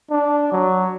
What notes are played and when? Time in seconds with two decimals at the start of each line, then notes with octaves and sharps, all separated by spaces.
0.11 D4
0.52 F#3